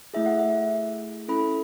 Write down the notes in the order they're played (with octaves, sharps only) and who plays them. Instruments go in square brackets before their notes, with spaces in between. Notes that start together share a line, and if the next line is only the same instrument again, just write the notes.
[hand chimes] A3 E4 G#4 E5
F#5
E5
C#4 E4 A4 B5